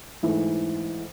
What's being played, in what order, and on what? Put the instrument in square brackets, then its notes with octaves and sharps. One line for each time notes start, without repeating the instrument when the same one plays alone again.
[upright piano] G#2 E3 A3